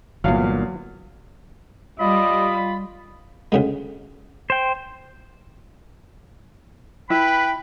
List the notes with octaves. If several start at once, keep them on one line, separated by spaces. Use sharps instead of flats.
G1 E2 A#2 F#3 F5 F6
G3 F4 D#5 B5
D2 C#3 G#3
C5 G5
E4 B4 G5 B5